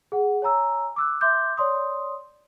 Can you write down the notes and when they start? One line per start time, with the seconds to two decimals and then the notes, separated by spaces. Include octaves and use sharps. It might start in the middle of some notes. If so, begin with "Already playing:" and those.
0.12 G#4 F#5
0.42 C#5 G#5 A#5 E6
0.96 D6 E6 F#6
1.21 E5 C6 D6 G6
1.57 C#5 D5 C6 D#6